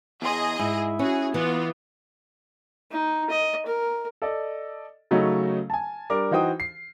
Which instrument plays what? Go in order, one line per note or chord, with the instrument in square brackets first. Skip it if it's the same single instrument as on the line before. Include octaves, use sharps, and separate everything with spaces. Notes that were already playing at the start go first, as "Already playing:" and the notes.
[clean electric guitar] E2 C6 [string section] G#4 D#5
[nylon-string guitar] G#2 [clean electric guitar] E4
[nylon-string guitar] C#4 [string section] F#4 G#4
[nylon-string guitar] E3 [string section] B3 F4
[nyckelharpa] D#4
D#5
A#4
[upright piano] A4 D5 D#5
C#3 F#3 A3 C#4 D#4
G#5 A5
G3 D4 A#4 D6
E3 D#4 F#4 C5 G5 D#6
C7